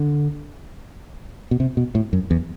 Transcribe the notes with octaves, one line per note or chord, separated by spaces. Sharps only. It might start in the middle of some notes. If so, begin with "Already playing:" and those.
Already playing: D3
B2
C3
B2
A2
F#2
E2